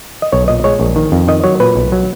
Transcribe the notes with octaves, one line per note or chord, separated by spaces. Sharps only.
D#5
B1 C#5
A#2 D#5
G#3 C#5
A#1
D#3
F2
D#3 D#5
F#3 C#5
A#2 B4
B1
F#3